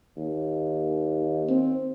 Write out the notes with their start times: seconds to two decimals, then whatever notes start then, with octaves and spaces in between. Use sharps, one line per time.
0.17 D#2
1.49 C4